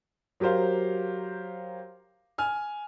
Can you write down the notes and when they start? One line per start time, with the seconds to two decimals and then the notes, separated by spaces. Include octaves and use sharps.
0.40 F#3 G4 A#4 C5 F5
2.38 G#5 F6